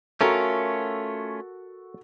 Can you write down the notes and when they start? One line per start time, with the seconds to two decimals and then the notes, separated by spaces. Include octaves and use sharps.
0.21 A3 C#4 F4 F#4 A4 A#4